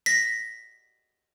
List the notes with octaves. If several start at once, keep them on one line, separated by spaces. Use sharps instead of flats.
A#6 B6